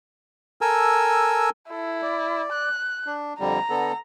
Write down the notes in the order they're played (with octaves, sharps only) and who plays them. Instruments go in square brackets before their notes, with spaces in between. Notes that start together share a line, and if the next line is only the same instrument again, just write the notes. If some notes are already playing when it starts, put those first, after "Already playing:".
[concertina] A4 A#4 G#5 E6
[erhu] E4 [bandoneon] A4
[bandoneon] D5
[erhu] F#6
[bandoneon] D4
[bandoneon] F2 D3 G3 [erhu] A#5
[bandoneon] D3 B3 A4